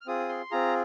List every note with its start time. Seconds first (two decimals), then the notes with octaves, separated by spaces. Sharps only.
0.01 F6
0.06 C4 F4 G#4 D#6
0.29 C6
0.51 C4 F4 G#4 A#5